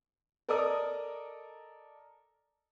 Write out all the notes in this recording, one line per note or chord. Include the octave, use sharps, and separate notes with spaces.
A4 A#4 D5 D#5 A#5 D#6